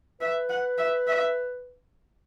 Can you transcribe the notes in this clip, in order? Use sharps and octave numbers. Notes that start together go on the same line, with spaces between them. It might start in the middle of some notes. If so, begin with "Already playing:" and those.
B4 E5
F#5
E5
E5